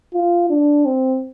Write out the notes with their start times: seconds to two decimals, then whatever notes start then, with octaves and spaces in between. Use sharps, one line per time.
0.14 F4
0.50 D4
0.85 C4